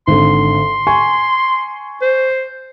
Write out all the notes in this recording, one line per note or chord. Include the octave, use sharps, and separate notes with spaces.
G#1 D3 C6
G#5 C#6
C5